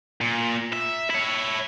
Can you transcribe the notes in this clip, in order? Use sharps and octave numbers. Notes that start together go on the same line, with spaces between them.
A#2
E5
E4 C#5